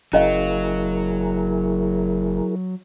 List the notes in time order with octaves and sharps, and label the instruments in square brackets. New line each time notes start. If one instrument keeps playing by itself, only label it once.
[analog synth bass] F#1 [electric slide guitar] F#3 [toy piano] C#4 D#5 F5 [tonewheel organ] E4 G#4 A#4